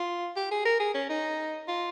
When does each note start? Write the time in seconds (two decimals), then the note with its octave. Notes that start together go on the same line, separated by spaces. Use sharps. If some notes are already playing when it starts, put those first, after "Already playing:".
Already playing: F4
0.36 G4
0.51 G#4
0.65 A#4
0.80 G#4
0.94 C#4
1.10 D#4
1.68 F4